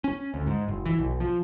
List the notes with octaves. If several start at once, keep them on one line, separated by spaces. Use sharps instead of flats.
C#4
D2
G#2
F#1
E3
B1
F3